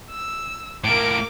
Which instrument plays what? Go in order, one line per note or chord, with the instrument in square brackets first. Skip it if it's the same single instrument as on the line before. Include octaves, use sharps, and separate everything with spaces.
[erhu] E6
[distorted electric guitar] A2 A#3 [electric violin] A#4 D7 [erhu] D6